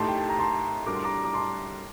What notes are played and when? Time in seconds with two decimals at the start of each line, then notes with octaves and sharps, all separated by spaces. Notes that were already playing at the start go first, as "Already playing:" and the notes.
Already playing: A2 A3 D#4 G4 A5 C6
0.08 G5
0.18 A5
0.29 A#5
0.39 A5 C6
0.87 A2 G3 D4 F#4 A#4 D6
0.95 C6
1.04 A#5 D6
1.25 D6
1.33 A5 C6